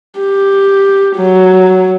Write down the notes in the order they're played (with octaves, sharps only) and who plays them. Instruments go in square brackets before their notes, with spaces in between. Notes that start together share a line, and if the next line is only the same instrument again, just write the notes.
[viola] G4
F#3